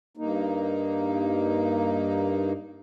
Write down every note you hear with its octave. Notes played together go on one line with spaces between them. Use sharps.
G2 A#3 D#4